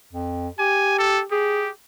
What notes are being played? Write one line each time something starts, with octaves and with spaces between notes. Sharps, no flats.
F2
G4 G#5
A4
G4 G#4